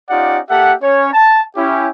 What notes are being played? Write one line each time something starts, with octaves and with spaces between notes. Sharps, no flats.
C#4 D#4 F4 G4 D5 F#5
A#3 G4 A4 E5 F#5
C#4 C#5
A5
C#4 E4 G4